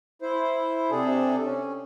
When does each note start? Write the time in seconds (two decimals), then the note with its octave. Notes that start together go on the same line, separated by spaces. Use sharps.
0.22 E4 C5
0.91 C3 D4 G#4 A4
1.45 C#4